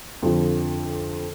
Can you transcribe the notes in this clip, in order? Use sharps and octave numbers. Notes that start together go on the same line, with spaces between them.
F2 D3 F3